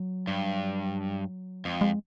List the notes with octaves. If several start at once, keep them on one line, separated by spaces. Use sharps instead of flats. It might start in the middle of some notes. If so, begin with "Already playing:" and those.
Already playing: F#3
G2
F2 G#3
G#3